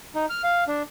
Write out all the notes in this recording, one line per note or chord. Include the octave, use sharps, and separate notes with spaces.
D#4
F6
F5
D4